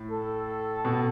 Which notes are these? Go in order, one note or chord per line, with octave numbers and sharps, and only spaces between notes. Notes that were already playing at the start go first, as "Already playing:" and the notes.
Already playing: A2
A4
B2